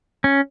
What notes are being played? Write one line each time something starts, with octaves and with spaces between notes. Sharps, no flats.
C#4